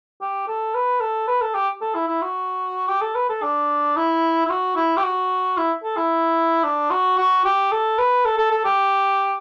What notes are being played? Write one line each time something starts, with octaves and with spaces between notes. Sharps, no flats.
G4
A4
B4
A4
B4
A4
G4
A4
E4
E4
F#4
G4
A4
B4
A4
D4
E4
E4
F#4
E4
G4
F#4
E4
A4
E4
D4
F#4
F#4
G4
A4
B4
A4
A4
A4
G4